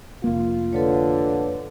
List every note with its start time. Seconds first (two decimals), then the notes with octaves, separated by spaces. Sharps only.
0.24 F1 A#3 F4
0.73 D3 A4 B4 C#5